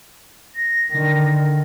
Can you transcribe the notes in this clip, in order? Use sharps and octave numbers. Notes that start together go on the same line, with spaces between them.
A#6
D3 D#3